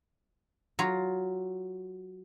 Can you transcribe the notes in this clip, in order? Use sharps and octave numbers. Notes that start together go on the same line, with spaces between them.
F#3 F4 F5